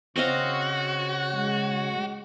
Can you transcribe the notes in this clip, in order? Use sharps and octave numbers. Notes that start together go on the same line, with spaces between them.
C#3 C4 F#4 C#5 D#5 F5 F#5
G#3